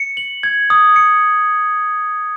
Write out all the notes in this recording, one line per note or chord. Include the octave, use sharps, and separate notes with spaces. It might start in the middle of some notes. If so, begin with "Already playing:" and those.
Already playing: C#7
F#7
G#6
D#6
C#7